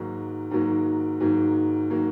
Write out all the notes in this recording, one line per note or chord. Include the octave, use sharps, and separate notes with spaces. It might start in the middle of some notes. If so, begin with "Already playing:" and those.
Already playing: G#2 D#3 F#3 A#3
G#2 D#3 F#3 A#3
G#2 D#3 F#3 A#3
D#3 F#3 A#3